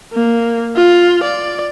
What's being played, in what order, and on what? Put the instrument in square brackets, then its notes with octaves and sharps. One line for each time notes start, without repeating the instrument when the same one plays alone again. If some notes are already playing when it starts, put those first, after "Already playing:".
[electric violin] A#3
F4
D5